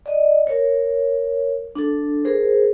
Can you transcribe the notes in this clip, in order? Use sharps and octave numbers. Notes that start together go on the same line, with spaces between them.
D5 D#5
A#4 C#5
D4 A4
G#4 A#4 C5